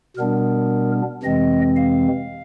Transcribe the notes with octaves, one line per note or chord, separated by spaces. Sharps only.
B2 G3 B3 D4 A#4
F2 C3 E3 G#3 C4 D#5
F5